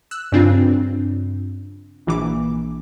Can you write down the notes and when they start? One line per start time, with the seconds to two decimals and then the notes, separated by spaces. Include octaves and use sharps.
0.11 E6 F#6
0.32 G2 C#3 C4 D4 F4
2.07 A#1 E3 D6